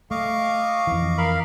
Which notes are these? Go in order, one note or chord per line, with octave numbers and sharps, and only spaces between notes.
A3 D#5 F5 C#6 D6
F2 E3
A#4 F5 B5